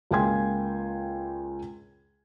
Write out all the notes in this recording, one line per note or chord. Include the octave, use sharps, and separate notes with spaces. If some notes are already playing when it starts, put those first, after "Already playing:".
C#2 A#3 G5 G#5 C6 G#6